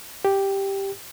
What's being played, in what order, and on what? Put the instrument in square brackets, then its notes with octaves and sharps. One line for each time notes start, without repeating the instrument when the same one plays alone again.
[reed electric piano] G4